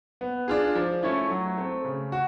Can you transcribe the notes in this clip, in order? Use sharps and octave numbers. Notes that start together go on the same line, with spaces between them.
B3
D4 F4 G#4
F3
A3 C#4 E4
F#3
A3 C4
C#3
F#4